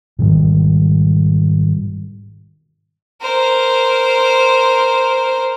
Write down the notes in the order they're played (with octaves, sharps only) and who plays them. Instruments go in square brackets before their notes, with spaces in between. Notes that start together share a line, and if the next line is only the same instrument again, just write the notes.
[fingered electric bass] G#2 B2 D#3 G3
[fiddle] A#4 C5